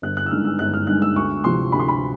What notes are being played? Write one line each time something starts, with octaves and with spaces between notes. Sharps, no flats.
G1 F#6
F#6
E6
G2 D#3 G#3 F6
E6
G1 F#6
F6
G2 D#3 G#3 F#6
E6
D2 C#6
C3 F3 C6
D2 B5
C6
B5